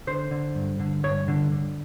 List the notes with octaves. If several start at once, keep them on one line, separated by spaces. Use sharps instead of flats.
D3 C5
D3
G2
D3
G2 C#5
D3
D3